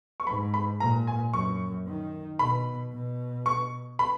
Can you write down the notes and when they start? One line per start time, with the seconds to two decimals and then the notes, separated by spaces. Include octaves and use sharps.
0.20 C#6
0.27 G#2 B5
0.54 B5
0.80 A#2 A#5
1.07 G#5
1.34 F#2 C#6
1.87 D#3
2.39 B2 B5
2.93 B2
3.46 C#6
3.99 B5